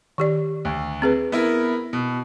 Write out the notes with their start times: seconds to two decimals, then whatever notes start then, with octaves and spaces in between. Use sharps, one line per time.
0.18 D#3 G4 D5
0.65 D2
1.02 C4 G#4 B4
1.32 B3 E4 A#4
1.93 B2